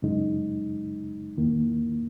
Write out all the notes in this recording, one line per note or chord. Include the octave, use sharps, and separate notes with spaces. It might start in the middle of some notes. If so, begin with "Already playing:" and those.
F#2 C#3 G#3 D#4
E2 D#3 A#3 E4